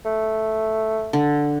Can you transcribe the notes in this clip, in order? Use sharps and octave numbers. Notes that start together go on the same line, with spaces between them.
A3
D3